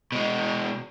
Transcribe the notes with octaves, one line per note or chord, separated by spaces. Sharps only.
B2 G#3